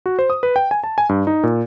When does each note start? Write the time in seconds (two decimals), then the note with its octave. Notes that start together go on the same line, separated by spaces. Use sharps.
0.06 F#4
0.19 C5
0.30 D#6
0.43 B4
0.56 G5
0.71 G#5
0.84 A5
0.98 G#5
1.09 G2
1.27 D#4
1.44 A#2